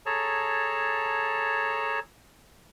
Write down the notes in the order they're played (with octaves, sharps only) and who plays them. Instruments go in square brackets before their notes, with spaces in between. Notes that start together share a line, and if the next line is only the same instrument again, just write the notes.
[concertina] G#4 A4 C#5 A5 A#5